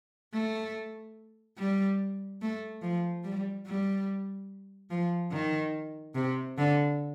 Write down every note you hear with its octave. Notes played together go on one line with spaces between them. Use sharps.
A3
G3
A3
F3
G3
G3
F3
D#3
C3
D3